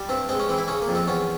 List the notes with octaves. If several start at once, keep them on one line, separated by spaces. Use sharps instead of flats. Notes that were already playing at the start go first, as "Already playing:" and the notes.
Already playing: G3
G2 C4
G#3 C4
C#4
E3 C4
E4
C#3 C#4
A#3
F2
C4
E2 C#4